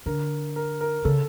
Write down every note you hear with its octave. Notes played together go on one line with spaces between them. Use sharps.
D3 A#4
A#4
A#4
C#3 A4